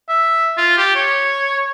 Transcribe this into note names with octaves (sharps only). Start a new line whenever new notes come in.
E5
F4
G4
C#5